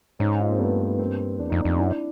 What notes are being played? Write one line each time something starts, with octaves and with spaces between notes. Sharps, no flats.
G#2 C#4 D#4
D#4 F4
A#3 C4
G2 A3 B3
A#3 C4
E2 D4
F2 D#4
F2 C4 D4
F#2 D4 E4